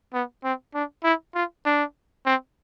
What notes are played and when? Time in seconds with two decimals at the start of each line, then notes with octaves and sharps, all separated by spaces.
0.14 B3
0.44 C4
0.74 D4
1.04 E4
1.35 F4
1.65 D4
2.26 C4